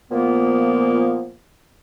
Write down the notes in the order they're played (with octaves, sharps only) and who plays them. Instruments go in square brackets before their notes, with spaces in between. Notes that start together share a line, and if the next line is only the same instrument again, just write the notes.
[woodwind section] A#2 F3 A#3 B3